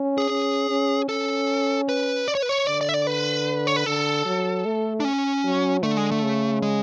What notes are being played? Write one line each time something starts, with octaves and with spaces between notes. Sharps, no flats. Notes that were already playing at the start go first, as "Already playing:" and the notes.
Already playing: C#4
G#4
C#4
C#4
C#4 A4
B4
D5
C#5
B4
C#5
D3 D5
D5
E5
D5
B4
C#5
B4
D3 A4
F#3
A3
D4
C#4
F#3
D3 A3
G#3
A3
C#3
G#3